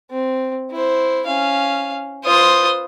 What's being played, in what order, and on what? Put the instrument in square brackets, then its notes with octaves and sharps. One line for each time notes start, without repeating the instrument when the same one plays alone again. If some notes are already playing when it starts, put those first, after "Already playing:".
[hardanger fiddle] C4
E4 C5
C#4 F5
[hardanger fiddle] F4 B4 [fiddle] C5 D#6